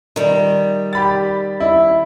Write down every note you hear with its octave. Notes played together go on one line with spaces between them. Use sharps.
D#3 G3
G4 B5 A6
E4